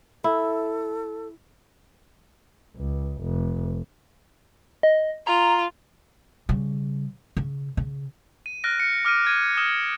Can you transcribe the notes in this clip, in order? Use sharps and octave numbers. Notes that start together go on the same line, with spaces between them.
E4 A4
C#2
F1
D#5
F4 A#5
C#3 G3
C#3
C#3
D#7
F6 F#6 A6 A#6 D7
C#7
D6 F6 D7 D#7
G#6 D#7
D#6 F6 E7 G7